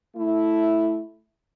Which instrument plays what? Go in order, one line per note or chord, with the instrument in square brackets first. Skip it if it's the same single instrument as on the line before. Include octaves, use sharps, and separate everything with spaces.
[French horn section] A3 E4